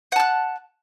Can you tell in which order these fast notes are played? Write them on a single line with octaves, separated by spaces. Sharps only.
F#5 A5 F#6